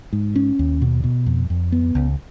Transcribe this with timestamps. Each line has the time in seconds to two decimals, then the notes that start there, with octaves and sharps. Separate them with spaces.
0.13 G#2
0.36 C#4
0.59 D#2
0.82 B2
1.04 B2
1.26 F2
1.50 F2
1.72 B3
1.95 C#2